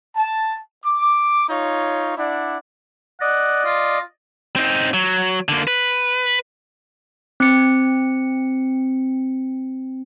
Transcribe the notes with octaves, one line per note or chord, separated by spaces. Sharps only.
A5
D6
D#4 F4 C#5
D4 E4 D5 F#5
D5 D#5 F#5
F4
C4 D#4
F#3
D3 A#3
B4
C4 C#7